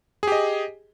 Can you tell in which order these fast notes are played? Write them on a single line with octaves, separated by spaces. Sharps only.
G#4 G4 D#5